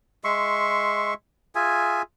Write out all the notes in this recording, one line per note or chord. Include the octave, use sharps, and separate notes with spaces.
G#3 E5 C6 C#6
F4 G#4 E5 G#5